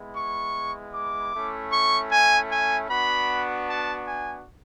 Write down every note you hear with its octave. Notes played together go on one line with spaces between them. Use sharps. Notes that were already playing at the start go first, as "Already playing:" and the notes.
Already playing: G#3 B3 E4
C#6
D6
A3 C#4 E4
C#6
G#5
G#5
B3 D4 F#4 B5
A5
G#5